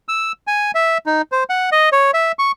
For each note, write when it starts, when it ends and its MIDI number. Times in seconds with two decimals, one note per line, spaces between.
0.08 0.32 88
0.47 0.71 80
0.75 0.98 76
1.06 1.22 63
1.32 1.44 72
1.49 1.70 78
1.72 1.89 75
1.92 2.11 73
2.14 2.32 76
2.39 2.52 85